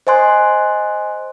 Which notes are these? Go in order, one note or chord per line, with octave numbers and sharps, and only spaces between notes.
C5 D#5 G#5 C6 F#6